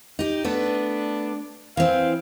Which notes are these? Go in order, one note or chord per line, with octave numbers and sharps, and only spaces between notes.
D#4 G4
A3 B3 D4 B4
E3 C4 F5